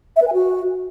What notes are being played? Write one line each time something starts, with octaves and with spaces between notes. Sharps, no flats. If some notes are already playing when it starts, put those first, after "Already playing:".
E5
B4
G#5
F#4